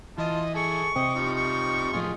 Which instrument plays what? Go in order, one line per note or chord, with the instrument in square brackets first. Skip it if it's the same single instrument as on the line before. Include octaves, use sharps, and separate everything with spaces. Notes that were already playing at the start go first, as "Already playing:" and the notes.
[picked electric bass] E3 [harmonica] F4 A5 [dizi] D#5
[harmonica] G#4 A4 [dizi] C#6
[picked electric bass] C3 [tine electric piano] C4 [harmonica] D#5
[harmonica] F3 G3 D#4
[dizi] C#6
[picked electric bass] D1 A2 F3 [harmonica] F4 G#4 D#5